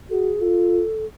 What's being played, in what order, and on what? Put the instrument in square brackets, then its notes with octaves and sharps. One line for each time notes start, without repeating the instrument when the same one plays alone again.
[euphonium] F#4 [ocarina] G#4 A4
[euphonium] F4 [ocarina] A4